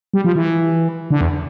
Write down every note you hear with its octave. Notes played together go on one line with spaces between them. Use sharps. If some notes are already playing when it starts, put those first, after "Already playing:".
G3
F3
E3
D3
E2